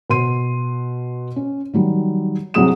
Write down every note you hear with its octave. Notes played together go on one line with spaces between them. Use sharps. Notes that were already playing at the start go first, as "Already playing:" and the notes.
B2 F#4 C6 D#7
C#4
D#3 F#3 G3
C2 F#3 G3 G#4 D#6 E7